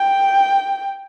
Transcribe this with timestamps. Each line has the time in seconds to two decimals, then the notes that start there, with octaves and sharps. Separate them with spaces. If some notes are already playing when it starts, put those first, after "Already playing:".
Already playing: G5